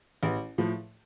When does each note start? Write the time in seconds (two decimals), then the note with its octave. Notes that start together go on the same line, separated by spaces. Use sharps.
0.23 A1
0.58 A2 F3